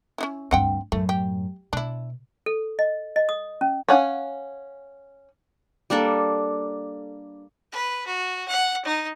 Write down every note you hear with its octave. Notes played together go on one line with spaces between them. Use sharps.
C#4 D#4 E4
D2 G2 C4 F#5 G5
F#2 A2 A3
G4
B2 D4 E4
A4
D#5
D#5
D#6
C#4
C#4 F5 F#5 G#5
G3 A#3 D4 A4
B4
F#4
F#5
D#4